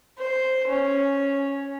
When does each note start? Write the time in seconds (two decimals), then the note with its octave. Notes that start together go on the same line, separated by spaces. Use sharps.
0.19 C5
0.68 C#4